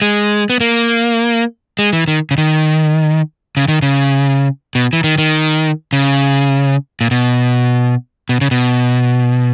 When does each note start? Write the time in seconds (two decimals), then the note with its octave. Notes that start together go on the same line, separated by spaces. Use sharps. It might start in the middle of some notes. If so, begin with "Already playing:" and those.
0.02 G#3
0.50 B3
0.61 A#3
1.79 G#3
1.93 E3
2.08 D#3
2.31 C#3
2.38 D#3
3.57 C#3
3.68 D#3
3.82 C#3
4.75 B2
4.93 E3
5.04 D#3
5.18 D#3
5.93 C#3
7.01 A#2
7.11 B2
8.29 B2
8.41 C#3
8.51 B2